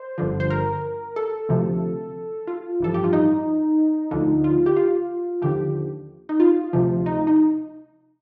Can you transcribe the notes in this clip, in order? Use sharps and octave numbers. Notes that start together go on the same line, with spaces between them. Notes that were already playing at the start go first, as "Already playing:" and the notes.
Already playing: C5
G1 G2 D3 F3
C5
A#4
A4
D2 C3 F3
F4
A1 G2 F3 A4
G4
F4
D#4
D2 D3 F3
F4
G4
F4
D#2 D3 F3 G4
D#4
F4
D2 C3 F3
D#4
D#4